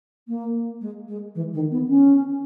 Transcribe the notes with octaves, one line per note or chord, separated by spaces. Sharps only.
A#3
G#3
G#3
E3
D#3
B3
C#4